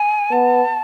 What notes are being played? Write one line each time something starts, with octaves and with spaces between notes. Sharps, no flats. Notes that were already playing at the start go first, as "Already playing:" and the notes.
Already playing: G#5
B3 A5